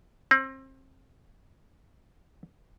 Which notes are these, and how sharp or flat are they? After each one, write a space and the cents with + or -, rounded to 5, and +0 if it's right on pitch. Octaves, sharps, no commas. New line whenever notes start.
C4 +30